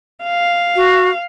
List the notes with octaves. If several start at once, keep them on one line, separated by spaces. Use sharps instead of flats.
F5
F#4